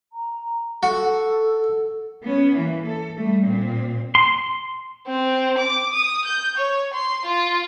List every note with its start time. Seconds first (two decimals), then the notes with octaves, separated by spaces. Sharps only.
0.13 A#5
0.83 F#4 A4
2.23 B3 C#4
2.57 E3 A#3
2.87 A4
3.17 G3 A3
3.47 A#2 C4
4.15 C6
5.07 C4
5.58 D6
5.93 D#6
6.26 G6
6.58 C#5
6.94 C6
7.26 F4